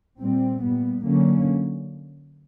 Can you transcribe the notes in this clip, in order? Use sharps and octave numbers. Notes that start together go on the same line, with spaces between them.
A#2 G3 C4
A#2 G3 B3
D3 F#3 A#3 C#4